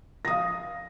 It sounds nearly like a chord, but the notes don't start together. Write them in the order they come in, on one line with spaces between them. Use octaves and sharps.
A#6 D#6 F5